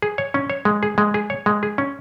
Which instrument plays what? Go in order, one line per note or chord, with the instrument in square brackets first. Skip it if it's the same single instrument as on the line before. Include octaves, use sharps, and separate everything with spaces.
[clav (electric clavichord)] G#4
C#5
C#4
C#5
G#3
G#4
G#3
G#4
C#5
G#3
G#4
C#4